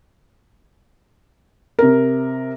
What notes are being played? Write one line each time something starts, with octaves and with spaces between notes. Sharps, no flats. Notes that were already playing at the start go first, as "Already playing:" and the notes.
C3 A#4